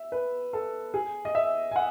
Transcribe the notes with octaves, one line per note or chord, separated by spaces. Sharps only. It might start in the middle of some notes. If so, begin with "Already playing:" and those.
Already playing: E5
B4
A4
G#4
D#5
E5
G#5
F#5